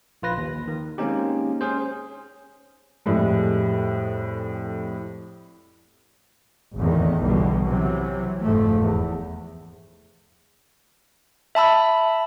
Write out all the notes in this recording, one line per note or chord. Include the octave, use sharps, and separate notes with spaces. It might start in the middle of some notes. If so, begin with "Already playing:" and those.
A#1 F4 B4 A#6
D#2
D#3
G#3 A#3 C4 C#4 D#4 G4
C#4 G#4 C5
F2 A2 G3 G#3
G#1 E2 A2 D#3
B1 E2 B2 D3 G3
C3 E3 F#3
F1 G#2 F3 A3
E2
E5 A5 B5 E6